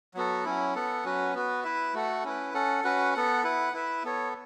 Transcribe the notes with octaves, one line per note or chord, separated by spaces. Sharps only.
F#3 B3 F#4 A4
F#3 C#4 E4
B3 A4 F#5
F#3 C#4 F#4 B4
B3 F#4 B4
E4 B4 E5
A3 F#4 A4 F#5
C#4 E4 B4
C#4 A4 F#5
C#4 F#4 B4 F#5
B3 A4 F#5
E4 B4 F#5
E4 B4 E5
B3 A4 C#5